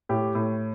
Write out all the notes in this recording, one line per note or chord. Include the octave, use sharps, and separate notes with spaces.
A2 G4
A2